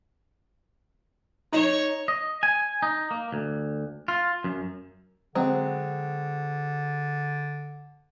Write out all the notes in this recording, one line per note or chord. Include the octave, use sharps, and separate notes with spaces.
D#4 C#5
D#5
G#5
D#4
A#3
D2
F4
F#2
D3 F#3 G#3 C4